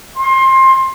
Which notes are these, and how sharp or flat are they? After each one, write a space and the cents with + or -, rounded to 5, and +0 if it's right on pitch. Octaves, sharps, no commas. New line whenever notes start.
C6 +25